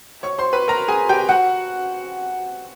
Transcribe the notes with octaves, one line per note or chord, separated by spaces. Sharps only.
C#5 C#6
C5 C6
B4 B5
A#4 A#5
G#4 G#5
G4 G5
F#4 F#5